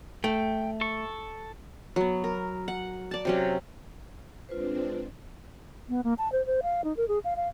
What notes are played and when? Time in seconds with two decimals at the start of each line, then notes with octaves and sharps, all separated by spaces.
0.24 A3 G5
0.81 A4 C#6
1.96 F#3 B3
2.24 A#4
2.68 F#5
3.11 D5 A5
3.25 C3 F#3 C#4
4.49 G#3 C4 D4 F4 B4 C5
5.89 B3
6.04 A#3
6.18 A5
6.32 C5
6.46 C5
6.63 F5
6.84 D#4
6.97 A#4
7.08 G#4
7.24 F5
7.36 F5